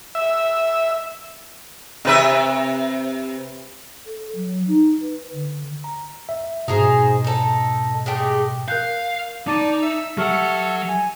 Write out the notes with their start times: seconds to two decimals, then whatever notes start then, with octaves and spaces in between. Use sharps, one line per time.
0.15 E5
2.05 C3 B4 E5
4.06 A4
4.35 F#3
4.68 D#4
5.02 B4
5.33 D3
5.84 A#5
6.29 E5
6.68 G#2 B2 D#4 G#4 C5
7.24 D#4 A4
8.06 G#3 A3 G4
8.68 A#4 F5 F#6 G6
9.47 D#4 D5 A5 D6 A6 D#7
9.82 E5 E6
10.17 F#3 G4 A4 E5 F#5 C#6 F6
10.88 G#5